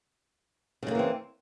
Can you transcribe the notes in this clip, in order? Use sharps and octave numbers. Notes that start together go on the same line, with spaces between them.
C#3 E3 G#3 A#3 C4